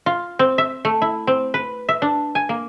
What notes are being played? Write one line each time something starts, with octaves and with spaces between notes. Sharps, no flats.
F4
C4
E5
A3
E4
C4
B4
E5
D4
G#5
A#3